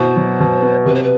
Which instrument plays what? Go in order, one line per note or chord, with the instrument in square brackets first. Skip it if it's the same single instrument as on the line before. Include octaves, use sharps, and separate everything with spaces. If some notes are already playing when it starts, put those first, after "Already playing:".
Already playing: [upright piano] B2 B3 E4 [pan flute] C5
[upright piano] F#3
B2
B3
[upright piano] C3 [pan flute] B4
[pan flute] C5
B4